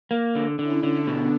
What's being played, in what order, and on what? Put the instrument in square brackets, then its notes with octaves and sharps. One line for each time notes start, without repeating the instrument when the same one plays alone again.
[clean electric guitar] A#3
D3
[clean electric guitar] D3 [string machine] C#4 E4
[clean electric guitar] D3
[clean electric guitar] B2 [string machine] B3 D4